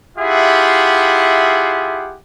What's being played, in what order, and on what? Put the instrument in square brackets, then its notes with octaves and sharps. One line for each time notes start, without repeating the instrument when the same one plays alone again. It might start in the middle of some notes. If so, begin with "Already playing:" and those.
[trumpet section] E4 F4 G4 G#4 E5 F#5